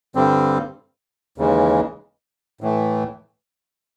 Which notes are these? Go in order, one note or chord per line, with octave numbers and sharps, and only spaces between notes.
G2 D3 G3 C4
D#2 C#3 E3 G#3
A2 E3 A3